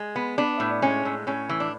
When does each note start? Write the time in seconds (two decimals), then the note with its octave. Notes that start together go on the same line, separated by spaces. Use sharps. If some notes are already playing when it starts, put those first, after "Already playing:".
Already playing: G#3
0.16 B3
0.38 B3 D4
0.60 A2
0.82 G#3 C#4
1.05 A2
1.27 A2 C#4
1.49 E3
1.60 D4